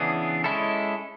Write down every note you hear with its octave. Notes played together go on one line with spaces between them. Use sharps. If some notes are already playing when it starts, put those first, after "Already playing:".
Already playing: C#3 E3 B3 D4 G#4
G#3 C#4 E4 A4